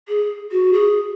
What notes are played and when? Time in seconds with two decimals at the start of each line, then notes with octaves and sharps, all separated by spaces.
0.08 G#4
0.51 F#4
0.73 G#4